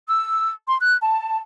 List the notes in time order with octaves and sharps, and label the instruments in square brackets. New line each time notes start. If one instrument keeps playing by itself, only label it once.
[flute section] E6
C6
F#6
A5